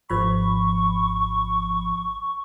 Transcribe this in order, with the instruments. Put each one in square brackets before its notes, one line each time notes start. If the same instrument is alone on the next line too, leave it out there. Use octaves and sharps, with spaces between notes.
[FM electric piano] G#1 F3 B5 [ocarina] C#6